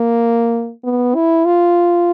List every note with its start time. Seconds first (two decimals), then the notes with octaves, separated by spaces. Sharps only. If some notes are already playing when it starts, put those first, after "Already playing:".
Already playing: A#3
0.85 B3
1.15 E4
1.46 F4